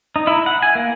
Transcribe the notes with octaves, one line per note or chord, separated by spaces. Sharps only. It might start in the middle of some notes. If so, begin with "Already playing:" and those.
D#4
E4
F#5
G#5
A#3